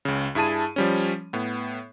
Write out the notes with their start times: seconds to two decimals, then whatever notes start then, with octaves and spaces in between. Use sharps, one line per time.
0.05 C#2 C#3
0.35 G2 E4 G#4 A5 D#7
0.76 F3 G3 C#4
1.33 A2 B3